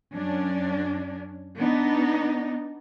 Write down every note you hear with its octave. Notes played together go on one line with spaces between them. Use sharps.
F#2 C#4 D4
B3 D4 D#4